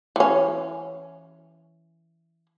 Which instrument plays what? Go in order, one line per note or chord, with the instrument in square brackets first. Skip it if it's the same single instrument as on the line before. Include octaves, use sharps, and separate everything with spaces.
[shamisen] E3 C#4